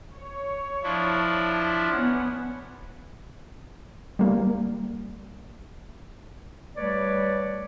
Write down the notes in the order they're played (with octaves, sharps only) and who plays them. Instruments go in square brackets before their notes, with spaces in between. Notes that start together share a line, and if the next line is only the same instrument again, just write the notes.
[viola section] C#5
[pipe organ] F3 D4 E4
[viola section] B3 C#4 F#5
[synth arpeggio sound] G3 A#3
[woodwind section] G3 A3 B4 C#5 D5